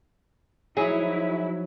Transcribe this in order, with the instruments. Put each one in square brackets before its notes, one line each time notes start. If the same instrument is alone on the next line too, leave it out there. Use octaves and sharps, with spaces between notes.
[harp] F3 G#3 D#4 [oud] F#3 [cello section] E4 [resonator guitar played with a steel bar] G#4